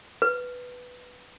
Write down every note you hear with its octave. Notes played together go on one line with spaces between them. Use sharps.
B4